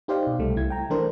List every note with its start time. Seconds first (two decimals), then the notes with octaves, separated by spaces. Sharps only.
0.08 D#4 G4 C5 D5 F5
0.27 B2
0.39 C2 G3 A3
0.56 C2 E4 G#6
0.70 G5 A#5
0.90 E3 A3 D4 A#4 C5